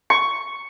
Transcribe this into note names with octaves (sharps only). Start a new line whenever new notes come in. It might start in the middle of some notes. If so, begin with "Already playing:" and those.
C#6